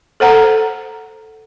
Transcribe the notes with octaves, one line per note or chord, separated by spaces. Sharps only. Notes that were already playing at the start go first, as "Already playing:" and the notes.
A4 C5 F#5 A#5